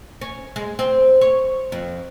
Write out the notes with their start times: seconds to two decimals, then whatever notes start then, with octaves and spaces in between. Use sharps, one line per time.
0.21 C#4
0.56 G#3
0.79 C4
1.21 C#5
1.72 F2